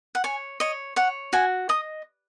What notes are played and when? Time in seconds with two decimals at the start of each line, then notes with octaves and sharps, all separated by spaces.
0.15 F#5
0.24 C#5 G#5
0.60 C#5 D#5
0.96 C#5 F#5
1.33 F#4 G#5
1.69 D#5 D#6